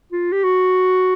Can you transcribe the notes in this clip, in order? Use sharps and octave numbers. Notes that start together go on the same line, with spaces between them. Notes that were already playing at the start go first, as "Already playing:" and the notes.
F4
G4
F#4